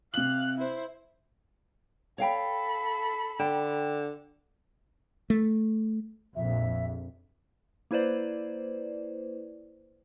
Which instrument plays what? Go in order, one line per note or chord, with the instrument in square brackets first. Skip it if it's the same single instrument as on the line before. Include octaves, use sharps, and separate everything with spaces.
[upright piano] C3 F#7 [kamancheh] F5 F#6
[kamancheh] E4 C5
[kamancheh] A4 B5 [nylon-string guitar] C#5 F5 G5
[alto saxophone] D3 [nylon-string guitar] G5
[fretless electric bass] A3
[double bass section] A#1 F2 [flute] E5
[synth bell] A#3 E4 B4 C5 D5